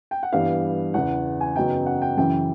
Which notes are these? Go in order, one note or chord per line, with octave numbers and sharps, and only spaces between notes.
G5
F#5
G2 E3 G3 B3 F5
E2 C#3 E3 F#5
G#5
F#2 C#3 F#3 B3 D#4 G5
F#5
G5
F#2 C#3 E3 G5